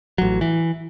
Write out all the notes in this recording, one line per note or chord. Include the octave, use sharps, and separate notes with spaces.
A1 F#3
E3